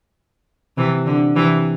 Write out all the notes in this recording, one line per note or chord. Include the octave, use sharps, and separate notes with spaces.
C3 E3
D3
C3 E3